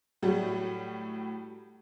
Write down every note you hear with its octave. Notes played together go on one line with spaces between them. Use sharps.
A2 F#3 G3 A3